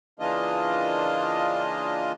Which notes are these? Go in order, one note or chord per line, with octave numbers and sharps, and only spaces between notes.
C#3 E3 A#3 D4 F4 D#5